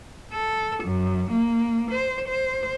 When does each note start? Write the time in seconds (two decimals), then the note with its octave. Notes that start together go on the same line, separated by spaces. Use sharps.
0.32 A4
0.83 F#2
1.31 A#3
1.89 C5
2.27 C5